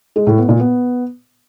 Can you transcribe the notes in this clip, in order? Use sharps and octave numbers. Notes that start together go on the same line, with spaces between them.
G#3
A2
B3
A#2
B3